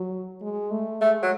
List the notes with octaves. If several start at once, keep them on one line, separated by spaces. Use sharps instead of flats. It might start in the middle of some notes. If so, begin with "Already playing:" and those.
Already playing: F#3
G#3
A3
G#3 A3
F#3